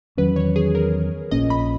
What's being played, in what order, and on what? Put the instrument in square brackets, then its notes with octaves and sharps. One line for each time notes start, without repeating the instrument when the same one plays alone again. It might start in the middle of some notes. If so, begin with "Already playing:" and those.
[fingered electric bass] E2 D#3 F#3 C#4 [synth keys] B4
[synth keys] C#5
G#4
A#4
[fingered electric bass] A#1 A#2 A#3 C#4 [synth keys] D#5
[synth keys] B5